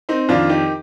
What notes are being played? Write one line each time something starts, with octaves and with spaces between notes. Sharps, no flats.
C4 D#4
F2 D#3 D4 F4
D#4 G4